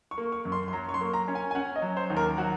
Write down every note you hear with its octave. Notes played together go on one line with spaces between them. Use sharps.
C#6
A#3
C#6
F#2
C6
C6
F#3 A#5
C#6
C6
A#3
A#5
C#4
G#5
G#5
C#4 F#5
D#5
F#3
C5
D#2
A#4
F#3 F#4